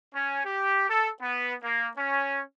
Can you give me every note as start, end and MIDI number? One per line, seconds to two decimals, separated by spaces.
0.15 0.40 61
0.45 0.89 67
0.90 1.09 69
1.21 1.54 59
1.63 1.88 58
1.97 2.41 61